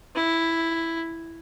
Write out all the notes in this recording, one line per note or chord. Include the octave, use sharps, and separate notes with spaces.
E4